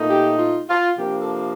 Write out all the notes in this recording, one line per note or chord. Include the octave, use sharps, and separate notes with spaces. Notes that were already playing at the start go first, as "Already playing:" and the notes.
Already playing: A#2 A3 D#4
G4
F4
F4
C3 F3 A#3 D4 G4
A4